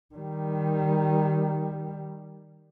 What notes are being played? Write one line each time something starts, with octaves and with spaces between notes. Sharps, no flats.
D#3 G3